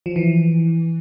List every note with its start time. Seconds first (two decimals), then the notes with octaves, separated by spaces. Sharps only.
0.06 F3
0.16 E3